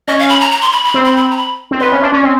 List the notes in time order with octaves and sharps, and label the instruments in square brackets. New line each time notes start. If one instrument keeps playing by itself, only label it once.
[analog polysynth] C#4 [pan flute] D#5
[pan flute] F5
B5
A#5
A#5
C6
B5
B5
[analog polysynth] C4
[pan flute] B5
B5
A#5
B5
[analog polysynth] C4
[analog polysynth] B3 [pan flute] C6
[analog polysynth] C#4
D4
C#4
C4